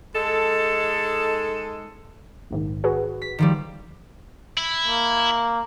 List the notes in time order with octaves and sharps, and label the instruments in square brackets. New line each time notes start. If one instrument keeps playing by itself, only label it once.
[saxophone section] G#3 D#4 A4
[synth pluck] A#1 G#2 D#3
F#4 G#4 B4
[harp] B6
D#3 F3 G3
[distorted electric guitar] E4
[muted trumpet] A#3